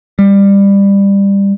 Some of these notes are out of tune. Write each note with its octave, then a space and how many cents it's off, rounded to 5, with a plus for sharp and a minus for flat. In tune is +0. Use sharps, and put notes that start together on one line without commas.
G3 +20